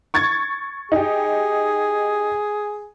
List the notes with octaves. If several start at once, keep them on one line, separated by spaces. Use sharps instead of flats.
C#6 G#6 A6
D#4 G4 G#4